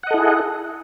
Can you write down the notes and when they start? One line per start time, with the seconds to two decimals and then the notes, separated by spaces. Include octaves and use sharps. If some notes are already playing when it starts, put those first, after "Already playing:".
0.03 F#5
0.07 D#5
0.11 A4
0.14 E4
0.18 G#4